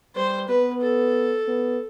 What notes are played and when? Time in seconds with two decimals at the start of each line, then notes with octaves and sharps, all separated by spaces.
0.16 G3 C5
0.48 B3 B4
0.81 A4
1.47 B3